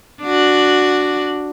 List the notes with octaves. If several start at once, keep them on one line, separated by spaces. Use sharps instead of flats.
D4 F#4